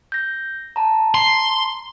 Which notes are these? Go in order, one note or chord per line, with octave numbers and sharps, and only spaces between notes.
G6 A#6
A5 A#5
C6